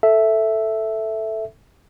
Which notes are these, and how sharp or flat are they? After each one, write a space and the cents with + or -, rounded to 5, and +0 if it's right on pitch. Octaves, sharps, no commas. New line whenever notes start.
A4 +0 E5 +0